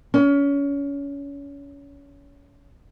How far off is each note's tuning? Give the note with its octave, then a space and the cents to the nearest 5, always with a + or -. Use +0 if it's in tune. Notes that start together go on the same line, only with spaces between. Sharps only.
C#4 +25